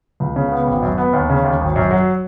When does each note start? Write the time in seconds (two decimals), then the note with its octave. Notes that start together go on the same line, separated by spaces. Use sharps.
0.20 C#2
0.36 C#3
0.52 B3
0.67 G#1
0.82 F#2
0.98 B3
1.13 D#2
1.30 C#3
1.45 D#2
1.61 G#1
1.76 F#2
1.91 F#3